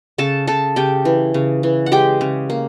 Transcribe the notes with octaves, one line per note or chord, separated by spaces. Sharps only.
C#3 A4 A5
C#3 A4 A5
C#3 G4 G5
E3
C#3
E3
F#5
G#3 G4 G5
C#3
A#3